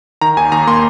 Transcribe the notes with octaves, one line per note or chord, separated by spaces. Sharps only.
D#3 A#5
D#2 G#5
D#2 A#5
A#3 C6